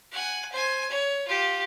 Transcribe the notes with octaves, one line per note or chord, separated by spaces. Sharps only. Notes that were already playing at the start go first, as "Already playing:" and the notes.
F#5 G#5
C5 G#5
C#5
F4 G4